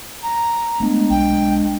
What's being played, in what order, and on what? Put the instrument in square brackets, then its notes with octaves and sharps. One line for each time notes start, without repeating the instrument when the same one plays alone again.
[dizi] A#5
[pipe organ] G#3 D4 [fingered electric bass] A3 B3
[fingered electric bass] B1 [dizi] G5